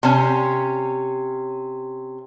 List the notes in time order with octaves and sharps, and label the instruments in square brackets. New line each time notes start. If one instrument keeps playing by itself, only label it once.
[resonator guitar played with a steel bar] C3 C#4